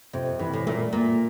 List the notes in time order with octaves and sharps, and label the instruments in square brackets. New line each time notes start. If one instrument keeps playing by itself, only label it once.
[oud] F2 [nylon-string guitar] C3
[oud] G2 [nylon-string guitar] E3
[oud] A2
[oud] A#2 [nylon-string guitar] A3
[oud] A#2 [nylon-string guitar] A#3